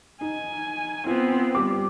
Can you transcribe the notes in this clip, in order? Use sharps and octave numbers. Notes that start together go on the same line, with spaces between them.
D#4 G#5
B3 C4 F4
G3 D6